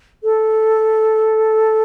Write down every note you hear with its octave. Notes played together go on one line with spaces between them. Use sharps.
A4